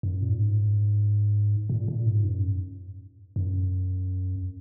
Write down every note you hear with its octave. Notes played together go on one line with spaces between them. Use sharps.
F#2
A#2
G#2
A#2
A#2
G#2
F#2
F#2